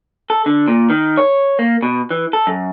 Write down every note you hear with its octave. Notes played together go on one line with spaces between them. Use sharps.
A4
D3
A#2
D#3
C#5
A#3
B2
E3
A4
F#2